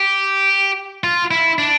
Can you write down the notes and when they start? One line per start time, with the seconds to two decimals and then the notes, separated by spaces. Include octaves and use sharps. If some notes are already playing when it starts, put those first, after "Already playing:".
Already playing: G4
1.04 F4
1.31 E4
1.59 D4